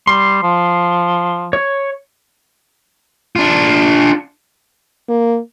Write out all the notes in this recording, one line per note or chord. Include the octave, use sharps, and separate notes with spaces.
G3 C6
F3
C#5
D4 F4
A#3